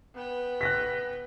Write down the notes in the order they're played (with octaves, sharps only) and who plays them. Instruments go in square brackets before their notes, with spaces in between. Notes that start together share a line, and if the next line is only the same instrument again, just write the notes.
[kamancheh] B3 G5
[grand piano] F#6 A#6 B6